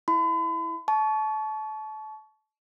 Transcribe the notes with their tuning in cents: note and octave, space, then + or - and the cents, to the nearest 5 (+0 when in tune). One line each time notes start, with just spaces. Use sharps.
E4 +0 B5 +40
A5 -30 C#6 +20